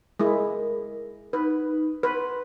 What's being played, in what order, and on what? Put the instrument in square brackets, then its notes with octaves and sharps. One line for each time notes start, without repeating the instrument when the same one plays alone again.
[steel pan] G#3 E4 [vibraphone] A#4
[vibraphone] D#4 [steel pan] B4
[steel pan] B4 [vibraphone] C6